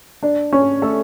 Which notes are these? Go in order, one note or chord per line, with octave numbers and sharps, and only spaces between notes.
D4 D5
C#4 C#5
A3 A4